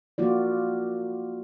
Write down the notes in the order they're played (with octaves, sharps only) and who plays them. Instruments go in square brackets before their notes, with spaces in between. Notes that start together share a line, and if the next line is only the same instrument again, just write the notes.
[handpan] A#3 F4 F#4 D5